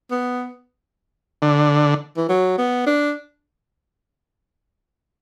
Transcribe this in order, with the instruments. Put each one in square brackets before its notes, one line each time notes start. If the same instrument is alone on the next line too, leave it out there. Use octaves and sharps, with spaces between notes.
[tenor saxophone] B3
[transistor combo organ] D3
[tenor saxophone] E3
F#3
B3
D4